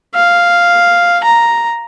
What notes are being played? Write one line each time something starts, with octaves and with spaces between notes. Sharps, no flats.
F5
A#5